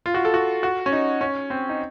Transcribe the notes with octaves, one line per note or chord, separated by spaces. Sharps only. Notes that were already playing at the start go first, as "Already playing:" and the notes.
F4
F#4
A4
F#4
F#4
C#4
D#4
C#4
C4
D#4